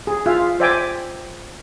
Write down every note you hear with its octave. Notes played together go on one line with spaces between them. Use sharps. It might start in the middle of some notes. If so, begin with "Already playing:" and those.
G#4
F4 G#4 E5 F5
C5 D5 E5 G5 G#5 D6